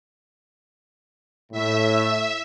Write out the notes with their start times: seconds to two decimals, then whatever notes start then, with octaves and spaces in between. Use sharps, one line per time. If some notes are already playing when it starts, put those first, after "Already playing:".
1.52 A2 E5